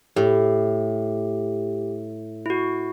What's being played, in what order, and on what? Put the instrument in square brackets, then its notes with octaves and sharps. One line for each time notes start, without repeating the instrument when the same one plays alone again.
[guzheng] A2 [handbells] G4
[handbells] E4 F#4